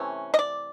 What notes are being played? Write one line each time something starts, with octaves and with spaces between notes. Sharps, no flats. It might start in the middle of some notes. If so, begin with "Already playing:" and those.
Already playing: C3 E3 A3 C#4
D#5
D5